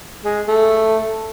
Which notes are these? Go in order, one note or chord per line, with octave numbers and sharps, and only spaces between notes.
G#3
A3